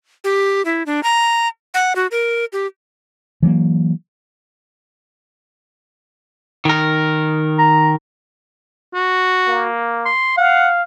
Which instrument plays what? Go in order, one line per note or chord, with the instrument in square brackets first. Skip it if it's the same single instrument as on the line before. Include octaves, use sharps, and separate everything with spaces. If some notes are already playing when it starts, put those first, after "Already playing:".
[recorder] G4
E4
D4
A#5
F#5
F#4
A#4
G4
[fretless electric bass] E3 F#3 A3 A#3
[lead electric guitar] D#3 A#4
[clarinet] A#5
[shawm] F#4
[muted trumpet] A#3
[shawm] C6
[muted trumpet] F5 [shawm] F#5